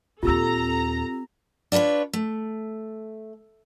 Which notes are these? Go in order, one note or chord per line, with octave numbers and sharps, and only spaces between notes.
D#2 A#2 C4 F4 G4 A4 A#5 E6
D4 F4 A4 B4 C#5
A3